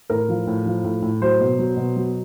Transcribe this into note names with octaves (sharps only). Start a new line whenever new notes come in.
A2 A#4
F3
A2
F3
A2
A2
F#3 C5
B2
F#3
B2
F#3